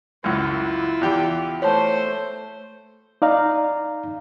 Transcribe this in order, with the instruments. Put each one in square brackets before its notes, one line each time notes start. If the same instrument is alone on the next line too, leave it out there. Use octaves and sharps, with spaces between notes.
[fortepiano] C#2 F#2 [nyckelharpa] E4 F4
[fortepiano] E2 G4 G5
[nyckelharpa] A3 C5 [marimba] C#5 A5
[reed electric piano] D#4 D5 F5 A#5